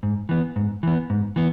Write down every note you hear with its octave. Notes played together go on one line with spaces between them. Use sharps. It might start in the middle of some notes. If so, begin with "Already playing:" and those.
G#2
E3 B3
G#2
E3 B3
G#2
E3 B3